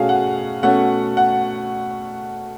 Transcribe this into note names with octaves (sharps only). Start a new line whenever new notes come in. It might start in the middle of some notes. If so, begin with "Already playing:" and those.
Already playing: B2 A3 C#4 F#4 G#4 F5
F#5
B2 A3 C#4 F#5
F#5